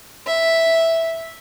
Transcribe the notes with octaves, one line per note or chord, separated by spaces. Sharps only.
E5